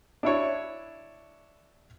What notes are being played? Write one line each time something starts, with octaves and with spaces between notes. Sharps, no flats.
D4 E4 C#5